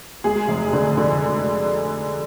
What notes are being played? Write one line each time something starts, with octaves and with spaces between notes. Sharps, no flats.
G#3 G#4
F1
D3
D3